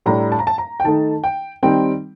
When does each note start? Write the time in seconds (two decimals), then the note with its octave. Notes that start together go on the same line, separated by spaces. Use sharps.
0.06 A2 G3 D4 A#5
0.32 A5
0.39 A#5
0.47 A5
0.58 A#5
0.80 G5
0.84 D#3 A3 D#4 A5
1.24 G5
1.63 D#3 G3 C4 D#4 G5